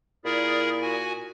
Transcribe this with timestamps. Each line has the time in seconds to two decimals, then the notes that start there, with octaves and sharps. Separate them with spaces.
0.25 A#2 E4 G#4 A#4 D5
0.82 F#4 G#5